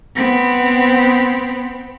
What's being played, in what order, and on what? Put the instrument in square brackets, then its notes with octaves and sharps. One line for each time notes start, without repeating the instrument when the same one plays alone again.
[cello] B3 C4